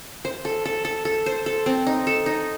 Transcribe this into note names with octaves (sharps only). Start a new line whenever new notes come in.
C5
A4
A4
A4
A4
C5
A4
C4
D#4
A4
D#4